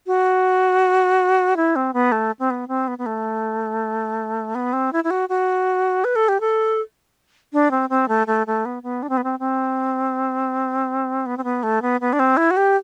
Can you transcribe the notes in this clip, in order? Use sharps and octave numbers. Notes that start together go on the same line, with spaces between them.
F#4
E4
C4
B3
A3
C4
B3
C4
B3
B3
A3
B3
C4
E4
E4
F#4
F#4
B4
A4
G4
A4
D4
C4
C4
A3
A3
A3
B3
B3
D4
C4
B3
C4
C4
B3
C4
B3
A3
B3
B3
D4
C4
E4
F#4
G4